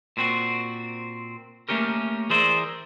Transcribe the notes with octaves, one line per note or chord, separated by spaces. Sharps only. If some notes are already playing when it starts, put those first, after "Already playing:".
A#2 C4 F#4
A3 A#3 C#4 G4 A#4
E3 G#4 A#4 C5 D5 E5